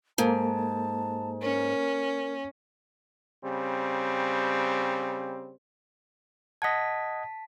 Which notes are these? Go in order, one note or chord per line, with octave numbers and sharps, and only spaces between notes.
G#2 A#3 A4 A5
C#4 A#4
C#3 G3 C4
D#5 F#5 A5 G#6 B6